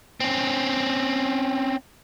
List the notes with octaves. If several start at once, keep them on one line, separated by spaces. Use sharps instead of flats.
C4 C#4